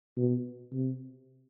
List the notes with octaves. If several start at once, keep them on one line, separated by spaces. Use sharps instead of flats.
B2
C3